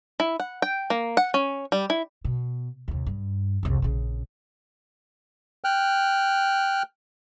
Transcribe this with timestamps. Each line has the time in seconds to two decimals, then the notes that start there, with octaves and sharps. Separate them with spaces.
0.20 E4
0.40 F#5
0.62 G5
0.90 A#3
1.17 F#5
1.34 C#4
1.72 G3
1.90 E4
2.25 B2
2.88 D#2 C3
3.06 G2
3.63 C2 F2
3.82 A#1 C#3
5.64 G5 F6 F#6